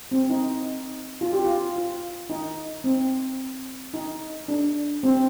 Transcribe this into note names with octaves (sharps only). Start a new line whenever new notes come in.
C4
D#4
F4
G4
F4
F4
D#4
C4
D#4
D4
C4